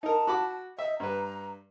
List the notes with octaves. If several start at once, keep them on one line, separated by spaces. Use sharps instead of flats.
D#4 A#4 A5
F#4 B5 D6
D#5 E5
G2 B4 A#5